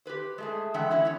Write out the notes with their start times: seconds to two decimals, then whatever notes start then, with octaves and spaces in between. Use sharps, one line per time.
0.06 G4 G#4 B4 C5
0.38 G#3 A3 G#4
0.74 D3 E3 G#3 E5 F#5 G5
0.90 D3 E3 F#3 C#4 E4
1.05 E2 C#5